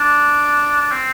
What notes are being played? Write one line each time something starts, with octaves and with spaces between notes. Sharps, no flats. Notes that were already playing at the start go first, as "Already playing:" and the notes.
Already playing: D4
D4
C4